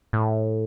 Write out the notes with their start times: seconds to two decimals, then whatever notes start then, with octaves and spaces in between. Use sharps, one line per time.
0.13 A2